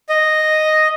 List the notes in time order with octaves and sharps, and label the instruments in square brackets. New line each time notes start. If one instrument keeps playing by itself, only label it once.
[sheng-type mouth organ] D#5